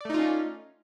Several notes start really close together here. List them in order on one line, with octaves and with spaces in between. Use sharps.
D5 A3 D#4 F4 C#4